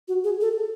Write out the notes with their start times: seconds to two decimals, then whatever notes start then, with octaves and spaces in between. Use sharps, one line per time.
0.08 F#4
0.24 G#4
0.41 A4